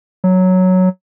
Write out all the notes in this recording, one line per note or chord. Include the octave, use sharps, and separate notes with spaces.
F#3